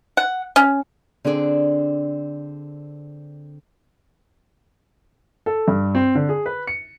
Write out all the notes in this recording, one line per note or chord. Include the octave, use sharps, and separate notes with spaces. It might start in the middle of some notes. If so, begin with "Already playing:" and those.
F#5
C#4
D3 C4 D4 G#4 D5
A4
G2
C4
D3
G#4
B4
C#7